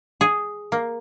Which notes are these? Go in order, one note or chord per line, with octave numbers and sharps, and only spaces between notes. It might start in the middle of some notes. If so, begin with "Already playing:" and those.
G#4
A#3